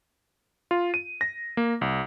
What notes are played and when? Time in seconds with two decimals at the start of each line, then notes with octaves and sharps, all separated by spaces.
0.71 F4
0.94 D#7
1.21 A#6
1.57 A#3
1.81 C2